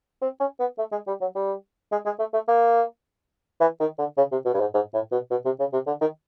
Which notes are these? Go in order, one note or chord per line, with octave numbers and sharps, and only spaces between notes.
C4
C#4
B3
A3
G#3
G3
F#3
G3
G#3
G#3
A3
A3
A#3
E3
D#3
D3
C#3
C3
B2
G2
G#2
G#2
A2
B2
B2
C3
C#3
C3
D3
D#3